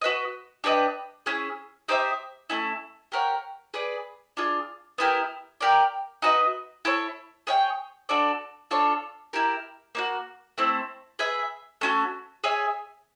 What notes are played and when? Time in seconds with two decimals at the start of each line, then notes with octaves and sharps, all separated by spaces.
0.01 F#4 B4 D#5
0.64 D4 G4 B4 D#5
1.26 C#4 E4 G#4
1.88 D#4 G4 C5 E5
2.50 A3 C#4 E4
3.12 G4 A#4 C#5 F#5
3.74 G#4 B4 D5
4.37 D4 F4 G#4
4.98 B3 E4 G4 A#4
5.61 G4 A#4 D5
6.22 D#4 F#4 B4 D#5
6.85 E4 A4 C#5
7.47 G#4 C#5 E5 G5
8.09 D4 F#4 A4 D5
8.71 D4 F4 A4 C#5
9.33 E4 G4 A#4
9.95 A#3 D#4 F#4
10.58 A3 C4 E4
11.19 G#4 B4 E5
11.81 A3 C#4 F#4
12.44 G#4 C#5 E5 G#5